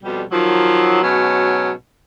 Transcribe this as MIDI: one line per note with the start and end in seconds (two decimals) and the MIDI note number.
0.03 0.22 41
0.03 0.22 47
0.03 0.22 55
0.32 1.00 51
0.32 1.00 53
0.32 1.00 54
1.02 1.71 44
1.02 1.71 47
1.02 1.71 54
1.02 1.71 61